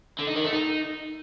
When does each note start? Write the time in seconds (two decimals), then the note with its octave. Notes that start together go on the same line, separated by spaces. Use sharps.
0.19 D3
0.27 D#4
0.36 D#3
0.44 A3
0.53 D#4